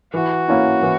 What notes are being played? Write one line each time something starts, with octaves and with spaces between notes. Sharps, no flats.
E3 F#4
A#3 C#4 E4
E3